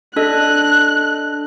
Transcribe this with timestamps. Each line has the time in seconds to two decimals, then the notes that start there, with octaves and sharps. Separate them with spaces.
0.16 D4 A4 D#5 F#6